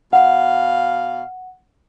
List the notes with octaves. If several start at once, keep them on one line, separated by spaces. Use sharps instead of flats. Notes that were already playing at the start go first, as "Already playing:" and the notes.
B2 F5 F#5